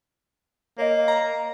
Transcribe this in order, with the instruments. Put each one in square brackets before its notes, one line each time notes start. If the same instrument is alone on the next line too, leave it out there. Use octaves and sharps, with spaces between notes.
[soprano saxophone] A#3 [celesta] C#5 D#5
[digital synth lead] A#5